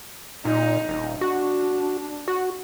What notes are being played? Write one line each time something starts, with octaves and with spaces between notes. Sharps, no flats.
A#2 D#4
D#1
D4 F#4
F#4